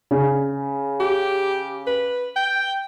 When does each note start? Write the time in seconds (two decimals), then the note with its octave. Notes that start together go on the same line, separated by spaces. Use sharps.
0.11 C#3
1.00 G4
1.87 B4
2.36 G5